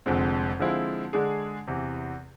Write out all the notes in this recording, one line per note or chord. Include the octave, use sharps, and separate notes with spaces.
F1 F2 D3 G#3 C4
D3 F3 G#3 C4 E4
D3 G#3 D4 G#4
E2 C3 E3